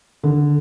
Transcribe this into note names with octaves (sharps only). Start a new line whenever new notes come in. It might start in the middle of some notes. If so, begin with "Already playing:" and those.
D3